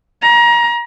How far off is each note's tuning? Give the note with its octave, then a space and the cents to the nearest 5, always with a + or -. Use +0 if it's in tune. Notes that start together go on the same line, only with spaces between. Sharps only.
A#5 +30